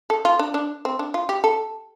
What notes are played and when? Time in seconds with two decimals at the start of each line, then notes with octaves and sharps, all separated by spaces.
0.10 A4
0.25 F4
0.39 D4
0.54 D4
0.85 C4
0.99 D4
1.14 F4
1.29 G4
1.44 A4